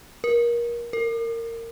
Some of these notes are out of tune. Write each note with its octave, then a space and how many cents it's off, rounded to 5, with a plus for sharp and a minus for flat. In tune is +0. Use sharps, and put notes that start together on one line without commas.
A#4 +25
A#4 -20